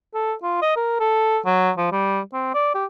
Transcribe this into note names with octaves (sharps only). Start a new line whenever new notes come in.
A4
F4
D#5
A#4
A4
F#3
F3
G3
C4
D5
G4